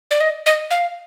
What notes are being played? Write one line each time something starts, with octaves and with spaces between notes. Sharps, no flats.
D5
D#5
D#5
F5